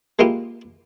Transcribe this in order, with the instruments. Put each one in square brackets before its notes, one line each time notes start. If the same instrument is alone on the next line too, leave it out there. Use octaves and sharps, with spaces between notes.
[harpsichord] G#3 A#3 E4 F4 G4